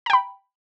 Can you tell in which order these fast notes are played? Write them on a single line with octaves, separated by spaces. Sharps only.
A#5 G5 B5